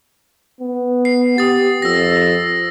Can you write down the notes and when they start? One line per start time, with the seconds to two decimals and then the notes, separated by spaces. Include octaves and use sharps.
0.61 B3
1.05 C7
1.38 G4 D#6 A6
1.82 F2 E6 A#6